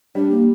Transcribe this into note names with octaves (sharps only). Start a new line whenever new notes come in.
G3 D4
A#3